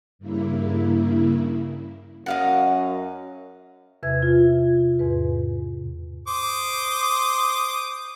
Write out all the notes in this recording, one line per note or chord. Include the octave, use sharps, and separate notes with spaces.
G2 C#3 A#3 E4
F#2 D#5 F5 F#5
E2 C3 B4 E5 G#6
F4
E2 G#2 B4
C5 D6 D#6